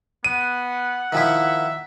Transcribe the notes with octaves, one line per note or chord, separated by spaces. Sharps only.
B3 F#5 D#7
D#3 F3 E4 E5